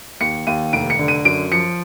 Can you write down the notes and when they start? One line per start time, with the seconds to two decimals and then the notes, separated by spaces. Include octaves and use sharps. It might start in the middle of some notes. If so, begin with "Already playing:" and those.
0.21 D#2 C#7
0.47 D#2 D#7
0.73 F1 D7
0.90 C#7
0.99 D3
1.08 D#7
1.25 F#2 D7
1.52 F3 C#7